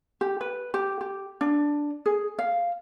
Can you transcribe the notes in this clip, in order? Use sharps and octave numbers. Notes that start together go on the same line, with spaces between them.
G4
B4
G4
G4
D4
G#4
F5